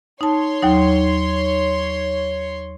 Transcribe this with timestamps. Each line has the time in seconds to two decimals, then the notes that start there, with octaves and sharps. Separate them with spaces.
0.21 D#4 C#5 A5 C6
0.62 D#2 F#3 D#4